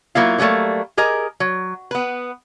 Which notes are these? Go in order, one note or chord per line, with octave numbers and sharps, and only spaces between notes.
F#3 A#3 E4 F4
D3 F#3 G3 A3 A#3
G4 G#4 A#4 D#5
F#3
B3 B4